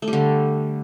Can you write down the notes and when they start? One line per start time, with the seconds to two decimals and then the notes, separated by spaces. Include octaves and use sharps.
0.02 A3
0.08 G3
0.13 D3